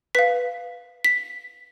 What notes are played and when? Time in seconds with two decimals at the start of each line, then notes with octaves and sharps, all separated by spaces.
0.15 B4 F5 B6
1.04 B6